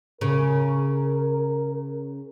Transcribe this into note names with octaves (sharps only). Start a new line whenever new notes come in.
C#3 A#4